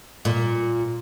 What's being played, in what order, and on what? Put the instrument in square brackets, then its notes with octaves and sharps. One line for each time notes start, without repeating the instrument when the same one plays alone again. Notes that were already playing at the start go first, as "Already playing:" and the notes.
[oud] A#2